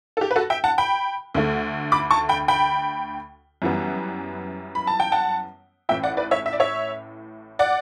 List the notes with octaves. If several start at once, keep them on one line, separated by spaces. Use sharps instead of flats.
A4
G4
B4
F#4 A4
E5 G5
F#5 A5
G5 B5
D2 D3 A3
B5 D6
A5 C#6
G5 B5
G5 B5
F#2 E3 G3 B3
B5
A5
G5
F#5 A5
A1 A2 E3 E5 G5
D5 F#5
B4 D5
C#5 E5
E5
D5
C#5 E5
D5 F#5